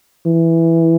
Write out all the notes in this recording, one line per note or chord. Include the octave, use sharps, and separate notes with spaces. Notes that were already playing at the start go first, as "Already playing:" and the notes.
E3